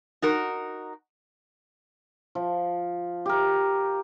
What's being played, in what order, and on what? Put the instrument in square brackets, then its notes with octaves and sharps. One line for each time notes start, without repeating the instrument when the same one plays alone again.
[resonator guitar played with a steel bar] D#4 F#4 A#4
[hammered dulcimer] F3
G4 A#4